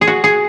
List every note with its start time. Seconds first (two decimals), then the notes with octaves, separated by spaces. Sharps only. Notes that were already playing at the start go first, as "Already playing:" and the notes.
0.01 G#4
0.07 F#4
0.24 G#4